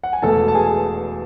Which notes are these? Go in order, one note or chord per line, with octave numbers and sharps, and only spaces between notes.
F#5
G#5
E1 E2 B2 A3 A4 A5
A5
G#4 G#5